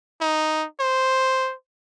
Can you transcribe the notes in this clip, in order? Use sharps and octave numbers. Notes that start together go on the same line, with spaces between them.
D#4
C5